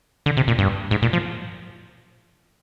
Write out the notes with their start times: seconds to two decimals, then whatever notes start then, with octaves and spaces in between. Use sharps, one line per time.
0.26 D3
0.37 C3
0.48 A#2
0.59 G2
0.91 G#2
1.02 A#2
1.13 F3